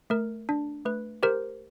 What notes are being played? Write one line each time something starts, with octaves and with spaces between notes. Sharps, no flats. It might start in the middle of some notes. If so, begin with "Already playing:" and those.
A3 A#4
D4
A3 B4
G4 A#4 C5